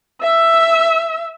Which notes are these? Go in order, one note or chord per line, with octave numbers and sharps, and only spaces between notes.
E5 E6